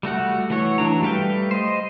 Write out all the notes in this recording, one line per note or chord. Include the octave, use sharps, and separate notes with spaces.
G3 A3 F#4 F#5
E3 A3 F#4 C#5
E3 F#3 D4 A#5
G3 A3 B4 F5 G5
C5 D#5